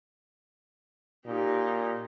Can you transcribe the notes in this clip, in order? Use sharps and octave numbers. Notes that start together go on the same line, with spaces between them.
A#2 D#4 G4